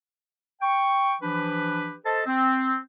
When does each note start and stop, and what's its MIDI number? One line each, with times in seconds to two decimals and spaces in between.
0.62 1.15 79
0.62 1.15 85
1.22 1.94 52
1.22 1.94 53
1.22 1.94 62
1.22 1.94 67
1.22 1.94 71
2.05 2.22 69
2.05 2.22 72
2.05 2.22 75
2.05 2.22 81
2.26 2.76 60